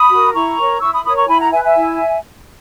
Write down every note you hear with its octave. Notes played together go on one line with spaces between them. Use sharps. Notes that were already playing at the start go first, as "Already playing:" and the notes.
Already playing: B5 D#6
F#4 A#4
E4 A#5 C#6
A#4 C#5
E4 C#6 E6
B5 D#6
A#4 C#5 B5 D#6
A#5 C#6
E4 G#5 B5
F#5 A#5
B4 E5 G#5
E5 G#5
E4